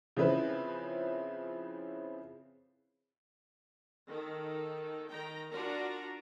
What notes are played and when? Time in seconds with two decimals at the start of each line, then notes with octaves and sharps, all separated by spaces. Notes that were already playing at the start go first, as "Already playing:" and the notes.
0.17 C#3 F3 C4 E4 B4
4.07 D#3 A4
5.10 D#3 G5 A#5
5.51 D4 F4 F#4 A#4 A#5